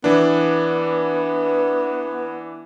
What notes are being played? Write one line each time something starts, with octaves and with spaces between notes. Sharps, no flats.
E3 B3 D4